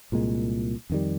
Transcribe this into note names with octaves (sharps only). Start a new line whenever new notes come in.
C2 A#2 G#3
F2 D#3 G3